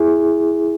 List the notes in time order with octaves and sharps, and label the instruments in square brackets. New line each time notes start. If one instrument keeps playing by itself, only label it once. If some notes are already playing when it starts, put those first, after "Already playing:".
Already playing: [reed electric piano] E4 G#4